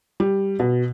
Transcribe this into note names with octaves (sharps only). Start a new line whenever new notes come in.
G3
B2